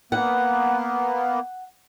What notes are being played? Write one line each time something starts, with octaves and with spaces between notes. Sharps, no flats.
A#3 B3 F#5